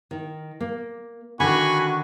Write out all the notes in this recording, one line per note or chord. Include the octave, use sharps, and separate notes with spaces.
D#3
A#3
D3 D#3 F#4 G#5 B5 C#6